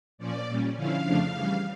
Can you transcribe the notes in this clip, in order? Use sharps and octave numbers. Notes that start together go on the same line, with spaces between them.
A#2 F3 C#4 D5
A#2 G3 C#4
D3 F3 C#4 E4 F5
F2 C#3 F3 A3 D4
C#3 E3 G3